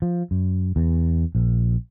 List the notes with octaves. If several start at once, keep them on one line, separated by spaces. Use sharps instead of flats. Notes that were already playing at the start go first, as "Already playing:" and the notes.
F3
F#2
E2
A#1